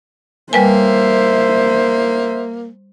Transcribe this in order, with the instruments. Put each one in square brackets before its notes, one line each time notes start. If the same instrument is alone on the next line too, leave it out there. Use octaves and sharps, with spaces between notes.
[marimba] G3 B4 G#5 [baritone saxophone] A#3 [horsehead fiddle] C5 E5